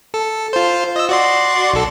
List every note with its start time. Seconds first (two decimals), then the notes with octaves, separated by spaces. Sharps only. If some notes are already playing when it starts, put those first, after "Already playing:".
0.14 A4
0.53 F4 C5
0.96 D#5 E6
1.09 F#4 D5 C6
1.73 B1 A4